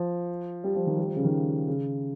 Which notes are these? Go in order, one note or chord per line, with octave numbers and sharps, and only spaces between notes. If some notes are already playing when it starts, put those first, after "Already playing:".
Already playing: F3
G3
F3
D#3
G3
F3
C#3
D#3
C#3